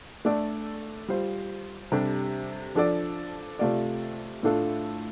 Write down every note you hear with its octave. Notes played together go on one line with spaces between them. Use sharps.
A3 D4 A4 D5
G3 F4 C5
C3 G3 D4 A4
F3 D4 A4 D5
C3 A3 F4 D5
A2 A3 D4 F4 A4